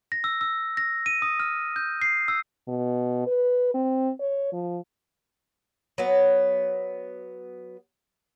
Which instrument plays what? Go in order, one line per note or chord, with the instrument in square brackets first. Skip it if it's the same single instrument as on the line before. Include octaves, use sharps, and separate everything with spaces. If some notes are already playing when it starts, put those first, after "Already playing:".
[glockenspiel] A#6
E6
E6
A#6
D#7
D#6
F6
G6
C7
E6
[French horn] B2
B4
C4
C#5
F3
[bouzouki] F#3 B3